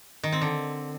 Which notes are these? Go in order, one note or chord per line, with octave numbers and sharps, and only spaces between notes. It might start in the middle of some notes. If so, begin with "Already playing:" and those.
D#3
C4
D3